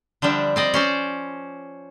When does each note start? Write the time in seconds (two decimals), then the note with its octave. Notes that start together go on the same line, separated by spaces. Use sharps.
0.22 D3 F3 G3 D4 E5
0.56 C4 D5 D#5
0.74 C#4 C5 D5